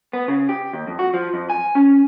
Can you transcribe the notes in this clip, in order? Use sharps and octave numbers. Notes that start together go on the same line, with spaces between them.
B3
C#3
G4
D#2
F2
F#4
F3
F2
G#5
C#4